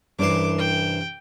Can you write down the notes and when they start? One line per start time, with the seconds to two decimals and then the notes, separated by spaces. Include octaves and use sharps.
0.19 C2 G2 E3 C#4 D4 C6 D6
0.58 G5